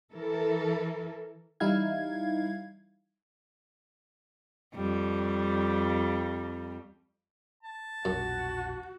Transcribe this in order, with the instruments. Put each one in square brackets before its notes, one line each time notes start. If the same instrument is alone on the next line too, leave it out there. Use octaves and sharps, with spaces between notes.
[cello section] E3 E4 A4 A#4
[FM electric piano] E3 G3 D#4 E4 F5 G#6
[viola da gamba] F2 G3
[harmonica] A5
[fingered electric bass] E1 A#1 [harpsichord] F#2 [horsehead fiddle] F#4